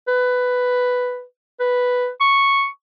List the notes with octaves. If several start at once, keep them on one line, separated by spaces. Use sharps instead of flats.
B4
B4
C#6